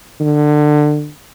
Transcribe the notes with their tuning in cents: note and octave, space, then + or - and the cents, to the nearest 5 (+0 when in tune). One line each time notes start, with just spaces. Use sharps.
D3 +25